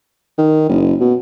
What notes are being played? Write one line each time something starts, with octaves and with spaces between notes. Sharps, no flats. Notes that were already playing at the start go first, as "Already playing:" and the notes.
D#3
F#1
B2